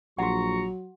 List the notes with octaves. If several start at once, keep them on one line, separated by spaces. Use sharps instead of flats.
A#1 F#3 F#4 F#5 A#5 C#6